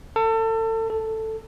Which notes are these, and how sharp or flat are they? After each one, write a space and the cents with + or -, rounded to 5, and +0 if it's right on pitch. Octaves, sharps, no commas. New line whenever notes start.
A4 +30
A4 +5